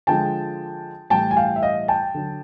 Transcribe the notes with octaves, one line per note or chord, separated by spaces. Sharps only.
D3 F3 G#3 G5 A5
A2 E3 G3 G5 A5
G#5
F5 G5
E5
D#5 F5
G5 A5
D3 F#3